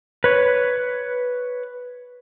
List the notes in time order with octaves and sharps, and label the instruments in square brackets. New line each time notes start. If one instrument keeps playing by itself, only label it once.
[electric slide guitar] B4 C#5